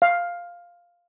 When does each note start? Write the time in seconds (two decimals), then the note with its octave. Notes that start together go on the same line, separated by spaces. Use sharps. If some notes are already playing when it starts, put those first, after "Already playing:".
0.02 F5